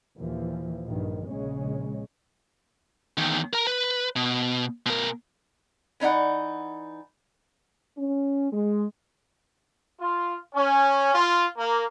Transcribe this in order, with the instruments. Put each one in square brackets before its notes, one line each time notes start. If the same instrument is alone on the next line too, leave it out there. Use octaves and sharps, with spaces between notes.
[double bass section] D#2 A#2 E3 F3
A#1 G2 D#3
A#1 C#3 G#3 C#4
[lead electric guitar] E2 D#3
A#4 A#5
B4
B2
B2 A#4
[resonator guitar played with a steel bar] E3 C#4 D#4 D5 F#5
[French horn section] C#4
G#3
[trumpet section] F4
C#4
F4
A#3